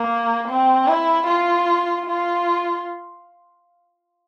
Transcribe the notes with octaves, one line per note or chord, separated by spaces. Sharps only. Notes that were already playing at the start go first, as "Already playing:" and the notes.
Already playing: A#3
C4
E4
F4
F4